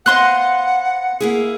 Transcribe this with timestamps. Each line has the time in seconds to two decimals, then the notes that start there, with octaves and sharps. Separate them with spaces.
0.06 B3 C5 D#5 F5 F#5 C6 F#6
1.21 A#3 E4 G#4